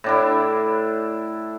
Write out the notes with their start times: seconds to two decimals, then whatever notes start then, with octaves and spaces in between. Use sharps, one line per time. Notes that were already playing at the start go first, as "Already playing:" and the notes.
0.04 A2 D4 E4